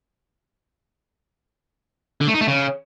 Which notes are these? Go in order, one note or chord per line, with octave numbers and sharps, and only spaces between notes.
D3
A3
D#4
A3
C#3